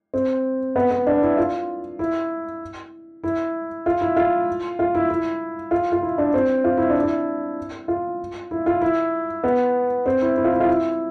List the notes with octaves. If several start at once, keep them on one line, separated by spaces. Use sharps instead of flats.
C4
B3
B3
D4
E4
F4
E4
E4
F4
E4
F4
F4
E4
E4
F4
F4
E4
D4
C4
F4
E4
D4
E4
F4
E4
F4
E4
B3
C4
E4
E4
F4
E4
F4
E4